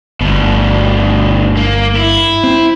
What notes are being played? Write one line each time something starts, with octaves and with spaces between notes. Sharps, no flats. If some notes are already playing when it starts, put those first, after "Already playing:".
G1 D2 B2
A#3
E4
C4